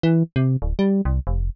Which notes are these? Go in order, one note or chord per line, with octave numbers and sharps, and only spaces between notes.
E3
C3
D1
G3
C2
F1